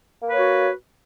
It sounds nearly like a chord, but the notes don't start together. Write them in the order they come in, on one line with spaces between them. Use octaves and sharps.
A#3 B4 C#5 F#4